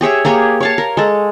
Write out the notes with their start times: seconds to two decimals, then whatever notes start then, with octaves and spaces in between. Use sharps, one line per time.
0.01 G4 G#4 C#5 E5
0.25 A#3 G4 G#4 C#5
0.61 C#5 F5 A5
0.78 A#4
0.97 G#3 A4